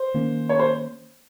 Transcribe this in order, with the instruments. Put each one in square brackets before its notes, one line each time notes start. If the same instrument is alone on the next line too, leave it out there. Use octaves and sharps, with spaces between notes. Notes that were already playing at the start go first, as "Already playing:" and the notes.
Already playing: [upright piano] C5
[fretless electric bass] D#3 A#3 C#4
[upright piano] C#5
C5